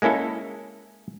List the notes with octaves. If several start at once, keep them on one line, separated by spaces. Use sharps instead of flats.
G#3 A#3 C#4 E4 A4